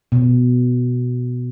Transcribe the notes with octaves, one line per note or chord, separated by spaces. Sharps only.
B2